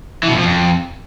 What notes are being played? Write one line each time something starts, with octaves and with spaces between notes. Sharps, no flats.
E3
B2
F2
F3
F2